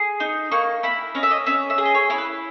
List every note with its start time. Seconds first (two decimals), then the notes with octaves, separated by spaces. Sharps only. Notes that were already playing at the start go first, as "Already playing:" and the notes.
Already playing: G#4
0.20 D#4
0.51 A#3 C#6
0.83 E4 B5
1.15 C#4 D#5
1.23 E5
1.31 D#5
1.46 C#4 E5
1.70 E5
1.78 G#4
1.86 D#5
1.95 C#5
2.10 E4 C#5
2.18 B4